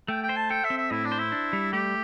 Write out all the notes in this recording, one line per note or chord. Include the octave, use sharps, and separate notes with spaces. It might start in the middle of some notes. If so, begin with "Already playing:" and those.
A3 G5
G5
C5
A5
A4 G5
E5
C4
E5
A2 E4
D4
C5
E4
D4
G3
A3 G4